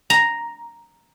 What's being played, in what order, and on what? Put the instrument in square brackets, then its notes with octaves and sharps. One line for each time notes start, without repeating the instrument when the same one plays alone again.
[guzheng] A#5